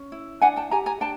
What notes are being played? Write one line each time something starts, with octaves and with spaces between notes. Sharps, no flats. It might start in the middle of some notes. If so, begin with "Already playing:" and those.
Already playing: C#4
E4
D4 F#5 G#5
G5 A5
G4 G#5 A#5
G#5 A#5
D4 G5 A5